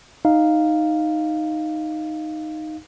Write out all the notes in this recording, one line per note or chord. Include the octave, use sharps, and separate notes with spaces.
D#4 F5